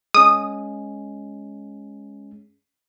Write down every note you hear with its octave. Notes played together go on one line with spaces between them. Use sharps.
G#3 C#4 D#6